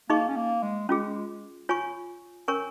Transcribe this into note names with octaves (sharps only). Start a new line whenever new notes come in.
A#3 D#4 G#4 D#5 C#6
C#4
A#3
G#3
G#3 C#4 F4 G#4
F4 C#5 G#5 C#6
C#4 A#4 C#5 G#5 C#6